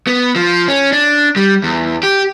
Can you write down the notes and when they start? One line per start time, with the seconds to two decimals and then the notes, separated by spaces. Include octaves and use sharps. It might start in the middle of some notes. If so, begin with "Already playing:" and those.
0.07 B3
0.36 F3
0.68 C#4
0.92 D4
1.36 G3
1.63 E2
2.03 G4